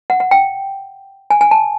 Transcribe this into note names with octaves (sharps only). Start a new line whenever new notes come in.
F#5
F#5
G5
G#5
G#5
A5